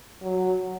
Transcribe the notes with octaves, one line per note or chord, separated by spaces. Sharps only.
F#3